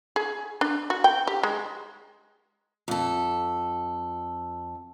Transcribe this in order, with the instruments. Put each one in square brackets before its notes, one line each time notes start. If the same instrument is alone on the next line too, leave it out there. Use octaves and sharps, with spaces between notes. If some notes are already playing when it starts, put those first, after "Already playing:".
[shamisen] G#4
D4
F#4
G5
G4
G#3
[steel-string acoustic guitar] F2 A4